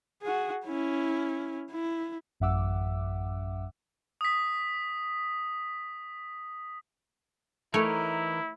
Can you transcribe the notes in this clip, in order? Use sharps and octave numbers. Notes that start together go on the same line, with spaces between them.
F#4 G#4
C#4 E4
E4
A1 F#2 E5 F#5 D6 E6
D#6 B6
E3 A3 D#4 E4 A#4 C#5